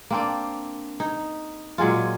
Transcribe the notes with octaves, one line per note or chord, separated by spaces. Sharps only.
A#3 C4 D4
D#4
A#2 F#3 G#3 F4